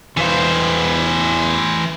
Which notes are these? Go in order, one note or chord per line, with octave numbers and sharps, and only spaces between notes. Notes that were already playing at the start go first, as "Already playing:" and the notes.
E2 E3 B4 C5 F5